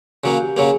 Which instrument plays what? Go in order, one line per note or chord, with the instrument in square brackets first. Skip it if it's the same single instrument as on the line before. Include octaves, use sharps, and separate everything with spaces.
[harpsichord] C#3 F#3 A#3 [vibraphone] F#4
[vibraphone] G4
[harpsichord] C#3 F#3 A#3 [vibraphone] G#4